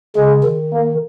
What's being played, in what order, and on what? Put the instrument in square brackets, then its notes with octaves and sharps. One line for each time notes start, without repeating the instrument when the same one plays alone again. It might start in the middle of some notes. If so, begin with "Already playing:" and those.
[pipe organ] C#3 [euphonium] G#3
[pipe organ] D#3
[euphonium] A#3